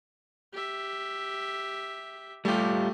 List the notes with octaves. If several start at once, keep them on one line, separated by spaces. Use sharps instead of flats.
G4 E5
G3 A3 F4 G4